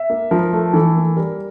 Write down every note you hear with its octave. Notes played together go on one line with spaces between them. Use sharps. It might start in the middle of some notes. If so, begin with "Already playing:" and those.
Already playing: E5
A#3
F3 A#4
A3
E3 A4
A#3
G3 A#4